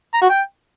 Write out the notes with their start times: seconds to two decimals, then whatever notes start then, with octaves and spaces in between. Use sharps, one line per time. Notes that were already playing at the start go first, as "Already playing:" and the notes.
0.14 A#5
0.22 F#4
0.30 G5